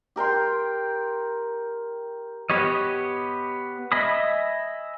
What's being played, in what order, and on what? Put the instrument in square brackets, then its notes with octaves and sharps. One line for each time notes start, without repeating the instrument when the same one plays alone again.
[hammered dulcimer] G4 A#4 G5 C6
[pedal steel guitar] B3 G4 C#5 D#5
D#5 E5 G#5 B5 D#6